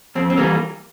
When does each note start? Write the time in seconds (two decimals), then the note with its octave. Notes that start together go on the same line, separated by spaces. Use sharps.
0.15 F2 C4
0.30 C4
0.37 E3 G3 A#3